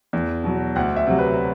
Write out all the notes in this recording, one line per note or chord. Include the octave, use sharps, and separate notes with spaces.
E2
B2 F#3
D2 F#5
E5
C3 F#3
B4